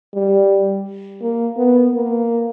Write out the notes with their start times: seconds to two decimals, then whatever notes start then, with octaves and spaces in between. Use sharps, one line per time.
0.14 G3
1.22 A#3
1.57 B3
1.94 A#3